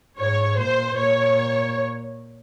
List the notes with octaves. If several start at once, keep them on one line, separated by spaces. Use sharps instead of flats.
G#2 C#5
A#2 C5
A#2 C#5